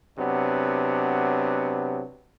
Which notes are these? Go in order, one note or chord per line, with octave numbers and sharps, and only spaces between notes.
C3 F#3 B3 D4